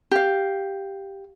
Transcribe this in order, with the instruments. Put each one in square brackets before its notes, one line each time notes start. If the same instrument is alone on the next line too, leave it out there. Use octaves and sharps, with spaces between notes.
[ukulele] G4 F5